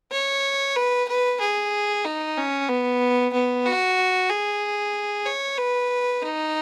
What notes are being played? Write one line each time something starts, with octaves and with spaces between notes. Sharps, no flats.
C#5
B4
B4
G#4
D#4
C#4
B3
B3
F#4
G#4
C#5
B4
D#4